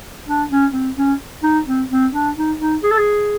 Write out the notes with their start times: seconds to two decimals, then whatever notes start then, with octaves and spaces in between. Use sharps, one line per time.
0.27 D4
0.50 C#4
0.73 C4
0.97 C#4
1.43 D#4
1.66 C4
1.90 C4
2.13 D4
2.36 D#4
2.60 D#4
2.83 G#4
2.91 A4
2.98 G#4